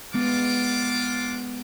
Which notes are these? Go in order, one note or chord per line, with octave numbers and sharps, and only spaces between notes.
G#3 B3 D4 F4 D6